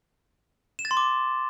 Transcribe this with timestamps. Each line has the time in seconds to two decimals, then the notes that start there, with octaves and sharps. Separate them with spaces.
0.79 E7
0.85 A6
0.91 C6
0.97 D6